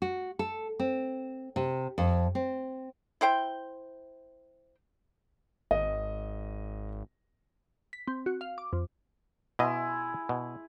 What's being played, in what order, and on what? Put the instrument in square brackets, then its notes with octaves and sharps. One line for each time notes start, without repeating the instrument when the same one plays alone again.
[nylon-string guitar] F#4
A4
C4
C3
F2
C4
[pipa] E4 C5 G5
[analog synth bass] G#1 [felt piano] D#5
[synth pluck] B6
C4
F#4
F5
D6
F2
[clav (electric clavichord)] B2 D#5 [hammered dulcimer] E4 G#4 C6
[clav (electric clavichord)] B2